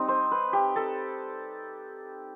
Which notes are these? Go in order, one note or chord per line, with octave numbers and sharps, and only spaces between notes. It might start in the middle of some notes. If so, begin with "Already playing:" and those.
Already playing: G3 C4 D#4 D#5
C5
B4
G4
A4